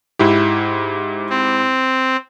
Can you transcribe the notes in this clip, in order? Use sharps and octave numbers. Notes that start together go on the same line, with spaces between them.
G#2 E4 G4
C4